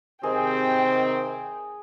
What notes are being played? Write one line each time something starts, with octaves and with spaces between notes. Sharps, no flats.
C3 D#3 C4 G#4 G5